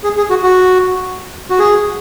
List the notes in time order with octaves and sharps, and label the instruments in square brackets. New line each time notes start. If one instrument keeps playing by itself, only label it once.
[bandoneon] G#4
G#4
F#4
F#4
F#4
G#4